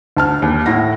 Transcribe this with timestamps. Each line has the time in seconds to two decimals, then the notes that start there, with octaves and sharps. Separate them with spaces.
0.17 D2 A5 F6
0.42 D#2
0.66 A2 E4 F#5 A#6